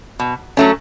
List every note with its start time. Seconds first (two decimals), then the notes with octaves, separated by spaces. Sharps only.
0.19 B2
0.57 F#3 A3 C#4